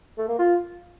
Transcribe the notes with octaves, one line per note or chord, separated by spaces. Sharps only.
A3
A#3
F4